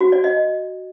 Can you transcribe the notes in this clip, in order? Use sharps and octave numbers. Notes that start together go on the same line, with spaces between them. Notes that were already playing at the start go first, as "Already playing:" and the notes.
F#4
D5
D#5